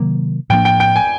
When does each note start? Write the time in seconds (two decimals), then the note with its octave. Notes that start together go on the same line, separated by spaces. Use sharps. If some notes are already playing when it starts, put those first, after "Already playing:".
Already playing: C3 D#3 F#3 A#3
0.50 A2 F3 A#3 D4 G5
0.65 G5
0.80 G5
0.96 G#5